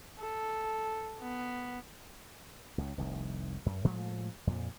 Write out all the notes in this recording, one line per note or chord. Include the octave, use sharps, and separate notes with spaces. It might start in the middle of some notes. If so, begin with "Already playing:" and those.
A4
B3
C#2 C#3
F1 C2 D#3
F#2
A2 F3 G#3 A3
F2 A#2